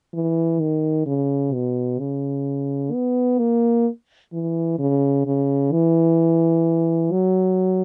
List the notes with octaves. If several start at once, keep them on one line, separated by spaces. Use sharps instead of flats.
E3
D#3
C#3
B2
C#3
B3
A#3
E3
C#3
C#3
E3
F#3